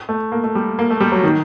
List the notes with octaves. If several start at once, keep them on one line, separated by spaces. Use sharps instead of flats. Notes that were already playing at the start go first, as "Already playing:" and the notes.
A3
A#3
A3
G3
A#3
A3
G3
F#3
D#3